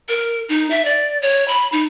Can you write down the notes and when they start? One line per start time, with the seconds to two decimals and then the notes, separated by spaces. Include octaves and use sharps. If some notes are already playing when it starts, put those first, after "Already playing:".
0.09 A#4
0.49 D#4
0.71 E5
0.85 D5
1.22 C#5
1.48 B5
1.72 D#4